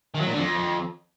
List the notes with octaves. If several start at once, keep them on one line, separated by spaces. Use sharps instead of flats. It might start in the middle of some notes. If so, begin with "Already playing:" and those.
D#3
F#3
A#2
D3
F2